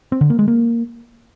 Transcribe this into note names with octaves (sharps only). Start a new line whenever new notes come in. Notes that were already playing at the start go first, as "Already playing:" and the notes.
C4
D3
A#3
G#3
A#3